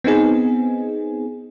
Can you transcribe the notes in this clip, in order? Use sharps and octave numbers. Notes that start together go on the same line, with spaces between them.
B3 C4 D#4 G#4